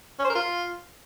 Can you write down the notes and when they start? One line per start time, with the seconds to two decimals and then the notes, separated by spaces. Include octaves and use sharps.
0.19 C#4
0.24 C5
0.30 A#4
0.35 F4